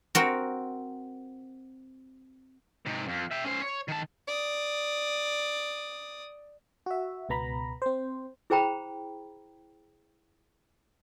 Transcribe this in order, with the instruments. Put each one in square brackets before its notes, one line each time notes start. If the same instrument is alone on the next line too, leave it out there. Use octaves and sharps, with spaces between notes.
[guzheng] C4 F#4 A#4
[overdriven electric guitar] G#2 C3
F2
E5 G5
C#4 C5
C#5
D#3 A5
[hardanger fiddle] D5 D#6
[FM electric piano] F#4 E5
C#2 B2 B3 A#5 B5
C4 C5
[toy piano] E4 G#4 C5 G5 A#5 B5